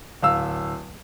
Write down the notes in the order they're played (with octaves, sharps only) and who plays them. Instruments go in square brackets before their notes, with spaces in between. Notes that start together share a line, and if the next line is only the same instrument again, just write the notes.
[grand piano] D1 F5 E6